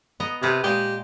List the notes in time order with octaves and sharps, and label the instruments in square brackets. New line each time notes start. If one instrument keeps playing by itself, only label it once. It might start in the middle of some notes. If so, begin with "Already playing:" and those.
[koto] B3 D#5 A#5
[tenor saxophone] C3 [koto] G#4 B4
[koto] A#2 G#3 G#4 [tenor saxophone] G4